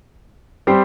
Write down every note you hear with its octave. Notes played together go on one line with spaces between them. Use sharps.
G3 C4 G4 C5